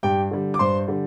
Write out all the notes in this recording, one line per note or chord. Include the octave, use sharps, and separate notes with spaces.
G2 G4 G5
D3 G3
D6
G2 C5 C6
D3 G3